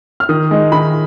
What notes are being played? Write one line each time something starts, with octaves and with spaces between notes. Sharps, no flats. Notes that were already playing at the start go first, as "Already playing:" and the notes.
F6
D#3 D#6
G#3 D#4
D#3 B5